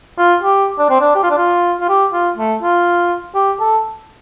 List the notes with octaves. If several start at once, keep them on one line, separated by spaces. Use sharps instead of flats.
F4
G4
D4
C4
D4
G4
F4
D4
F4
F4
G4
F4
A3
F4
G4
A4